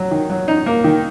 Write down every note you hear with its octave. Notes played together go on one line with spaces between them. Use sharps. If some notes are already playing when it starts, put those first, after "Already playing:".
Already playing: F#3
D#3
F#3
D#4
A#3
D#3